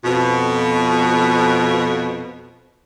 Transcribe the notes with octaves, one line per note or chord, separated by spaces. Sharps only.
F2 B2